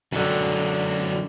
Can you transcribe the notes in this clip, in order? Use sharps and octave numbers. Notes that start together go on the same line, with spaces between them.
F#2 D3 D#3 F#3